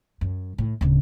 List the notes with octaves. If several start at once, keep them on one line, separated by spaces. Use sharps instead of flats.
F#2
A2
D1 C#3